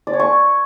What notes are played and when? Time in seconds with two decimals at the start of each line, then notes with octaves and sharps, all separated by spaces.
0.07 D5
0.13 C#5
0.20 C#6